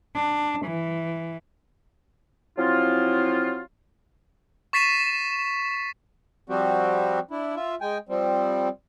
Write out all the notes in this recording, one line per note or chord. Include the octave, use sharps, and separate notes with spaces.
D4
E3
F3 F#3 C4 E4 F4
C#6 A6 B6 C7 D#7 E7
F3 G3 C4 F#4 G4
D4 E4
F4 E5
G#3 G5 G#5
F3 G3 C4